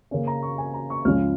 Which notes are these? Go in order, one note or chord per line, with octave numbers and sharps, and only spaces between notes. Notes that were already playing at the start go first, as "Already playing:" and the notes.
C#3 A#3 C#4
A#5
C#6
G#5
A#5
C#6
C#2 C#3 F3 G#3 F6